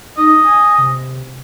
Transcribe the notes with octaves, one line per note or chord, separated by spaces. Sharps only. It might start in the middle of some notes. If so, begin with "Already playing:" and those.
D#4 D#5
G#5
C3